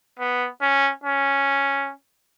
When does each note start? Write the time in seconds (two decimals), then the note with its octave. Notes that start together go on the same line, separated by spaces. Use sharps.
0.19 B3
0.61 C#4
1.04 C#4